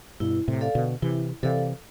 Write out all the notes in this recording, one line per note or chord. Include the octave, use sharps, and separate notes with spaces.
G2 B2 E4
A2 C3
A4 D5 F5
B2 D3
C3 E3 E4
C3 E3 A4 D5 F5